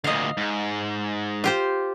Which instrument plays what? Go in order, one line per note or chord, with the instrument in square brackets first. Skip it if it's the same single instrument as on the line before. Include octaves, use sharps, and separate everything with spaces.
[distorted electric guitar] D2 A#2 [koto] D#5 F5
[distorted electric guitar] G#2
[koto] F4 G4 C5